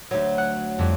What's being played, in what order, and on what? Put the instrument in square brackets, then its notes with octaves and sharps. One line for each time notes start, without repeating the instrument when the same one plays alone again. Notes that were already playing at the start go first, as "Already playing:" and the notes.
[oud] D2 F#3
[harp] F#5 F#6
F2 G3